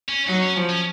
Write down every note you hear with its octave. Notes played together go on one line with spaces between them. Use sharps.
C#4
F#3 D#4
C#4
F3
C#4